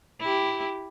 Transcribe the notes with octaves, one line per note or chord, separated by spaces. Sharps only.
E4 G4